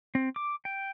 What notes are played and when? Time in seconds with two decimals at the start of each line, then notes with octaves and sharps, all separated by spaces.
0.15 C4
0.36 D6
0.65 G5